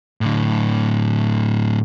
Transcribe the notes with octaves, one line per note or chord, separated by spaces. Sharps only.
A2 D3